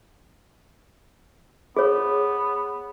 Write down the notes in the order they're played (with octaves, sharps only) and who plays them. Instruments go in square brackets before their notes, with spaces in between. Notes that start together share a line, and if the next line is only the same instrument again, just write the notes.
[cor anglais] B3 [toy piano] G#4 C#5